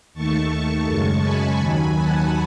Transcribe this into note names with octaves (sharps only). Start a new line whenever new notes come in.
D#2 D#3 A3 A5 C#6
A5 C#6
F#2 C#3 G#3
G#5 B5
D#2 D#3 F#3
F#5 A5